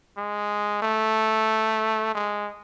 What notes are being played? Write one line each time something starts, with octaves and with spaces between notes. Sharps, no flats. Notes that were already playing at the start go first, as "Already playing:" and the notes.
G#3
A3
G#3